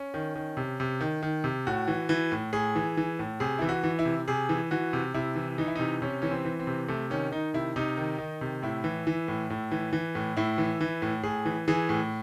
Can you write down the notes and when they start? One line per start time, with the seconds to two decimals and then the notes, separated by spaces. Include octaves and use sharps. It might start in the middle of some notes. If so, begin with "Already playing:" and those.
Already playing: C#4
0.14 D#3
0.35 D#3
0.57 C3
0.80 C3
1.01 D#3
1.23 D#3
1.44 C3
1.67 A2 F#4
1.88 E3
2.09 E3
2.32 A2
2.53 A2 G#4
2.75 E3
2.97 E3
3.19 A2
3.40 C3 G#4
3.58 E3 E4
3.69 F#4
3.83 E3
3.99 E4
4.05 C3
4.28 C3 G#4
4.49 E3
4.71 E3 F#4
4.93 C3
5.14 C3 E4
5.36 E3
5.58 E3 D#4
5.67 E4
5.75 C3 D#4
6.02 C3 C#4
6.22 E3 C#4
6.31 C4
6.45 E3
6.59 C4
6.67 C3
6.88 C3 A3
7.10 D#3 C#4
7.32 D#3 D#4
7.54 C3 E4
7.76 C3 D#4
7.97 D#3
8.18 D#3
8.41 C3
8.62 A2 E4
8.84 E3
9.07 E3
9.28 A2
9.50 A2
9.72 E3
9.93 E3
10.15 A2
10.37 A2 E4
10.58 E3
10.81 E3
11.02 A2
11.23 A2 G#4
11.45 E3
11.68 E3 G#4
11.89 A2